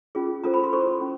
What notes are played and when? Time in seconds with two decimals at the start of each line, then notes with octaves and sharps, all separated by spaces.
0.15 C#4 F4 G#4
0.44 C#4 F4 A4 C5 A#5
0.54 B5
0.64 C6
0.73 E4 A4 C5 C#6
1.01 C#4